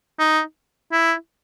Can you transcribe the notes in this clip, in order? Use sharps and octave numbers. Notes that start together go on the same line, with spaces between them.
D#4
E4